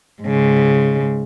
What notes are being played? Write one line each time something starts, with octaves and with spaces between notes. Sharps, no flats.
G#2 C#3